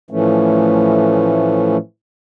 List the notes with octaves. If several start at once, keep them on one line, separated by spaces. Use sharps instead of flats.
A2 E3 F3 A3 C#4